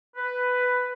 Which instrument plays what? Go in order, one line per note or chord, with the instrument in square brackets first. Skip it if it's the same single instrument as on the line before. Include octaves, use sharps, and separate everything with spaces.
[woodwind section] B4